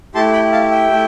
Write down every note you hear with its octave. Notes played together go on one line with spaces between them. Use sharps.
A3 E4 G4 A5 C6
G5 B5
F5 A5
E5 G5
A3 E4 G4